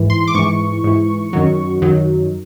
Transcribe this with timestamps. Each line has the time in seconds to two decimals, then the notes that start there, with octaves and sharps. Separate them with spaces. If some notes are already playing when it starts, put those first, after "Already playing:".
Already playing: G#2 E3
0.10 C6
0.28 D6
0.34 G#2 E3 C#6
0.84 G#2 E3
1.33 F#2 D#3 F#3
1.82 F#2 D#3 F#3